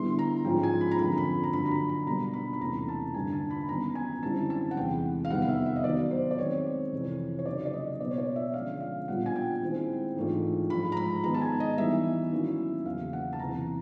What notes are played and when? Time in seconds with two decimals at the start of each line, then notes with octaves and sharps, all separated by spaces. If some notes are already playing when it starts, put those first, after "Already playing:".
Already playing: D3 G3 B3 E4 C6
0.19 A#5
0.44 G#2 F3 G#3 C#4 F4 G5
0.63 G#5
0.81 B5
0.91 A#5
0.99 F2 D3 F3 A#3 B5
1.18 B5
1.44 A#5
1.53 G2 D3 F#3 B5
1.66 B5
1.71 A#5
1.89 B5
2.06 B2 G3 A#3 D4 A#5
2.33 B5
2.53 B5
2.61 E2 C3 E3 A3 C#4 A#5
2.88 A5
3.14 G2 D3 G3 A#3 G#5
3.33 A5
3.51 B5
3.69 F#2 D#3 G3 B3 A#5
3.95 G#5
4.23 F#2 D3 G3 C4 E4 A5
4.50 A5
4.71 F#5
4.76 E2 C3 E3 G#3 G5
5.25 F5
5.30 F2 C3 D#3 G3 B3 F#5
5.42 F5
5.49 E5
5.66 E5
5.76 D#5
5.84 D#3 F#3 B3 D5
6.11 C5
6.31 D5
6.38 D#3 G#3 C4 C#5
6.92 F2 C3 E3
7.39 C#5
7.46 C#3 F#3 A#3 D#4 D5
7.66 D5
7.73 D#5
8.00 B2 F#3 B3 D5
8.11 C#5
8.18 D5
8.36 E5
8.54 D3 F3 G#3 C#4 F5
8.80 F5
9.08 A#2 G3 B3 D4 F4 F#5
9.26 G#5
9.36 G5
9.62 D#3 G#3 C4 E4
10.16 G#2 E3 A3 D4 F4
10.70 G#2 F3 G#3 B5
10.92 A#5
10.97 B5
11.23 D#3 G#3 B3 D#4 A#5
11.34 A5
11.41 G#5
11.60 D#5
11.78 E3 G3 B3 D#4 E5
12.32 D#3 F#3 A#3 C#4 E4
12.85 E2 C#3 F#3 A#3 F5
13.13 F#5
13.33 A5
13.39 E2 C3 E3 A#5